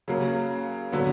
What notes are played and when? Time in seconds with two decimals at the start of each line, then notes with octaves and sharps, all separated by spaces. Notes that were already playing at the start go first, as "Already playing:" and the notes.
0.08 C#3 F#3 A#3
0.92 D3 F#3 B3